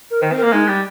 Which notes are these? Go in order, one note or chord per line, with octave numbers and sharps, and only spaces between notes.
A#4
D#3 C5
C4
A#4
A#3
G#3 D#4
G3